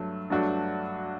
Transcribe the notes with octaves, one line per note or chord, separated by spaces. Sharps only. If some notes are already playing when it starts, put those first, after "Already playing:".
Already playing: G2 F#3 A3
G2 F#3 A3 D4 F#4